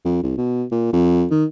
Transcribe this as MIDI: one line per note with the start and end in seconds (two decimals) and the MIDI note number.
0.05 0.23 41
0.23 0.34 36
0.38 0.64 47
0.71 0.89 46
0.93 1.26 41
1.31 1.45 51